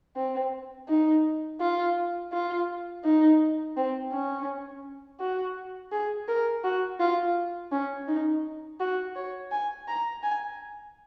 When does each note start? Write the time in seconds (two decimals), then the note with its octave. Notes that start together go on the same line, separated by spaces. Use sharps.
0.16 C4
0.89 D#4
1.60 F4
2.33 F4
3.05 D#4
3.76 C4
4.12 C#4
5.20 F#4
5.92 G#4
6.28 A#4
6.64 F#4
7.00 F4
7.72 C#4
8.08 D#4
8.80 F#4
9.16 C#5
9.52 G#5
9.88 A#5
10.23 G#5